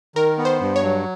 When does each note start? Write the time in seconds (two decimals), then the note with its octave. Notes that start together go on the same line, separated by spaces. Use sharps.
0.15 D#3 A#4
0.38 B3
0.45 C5
0.61 G2
0.76 C#5
0.82 F#3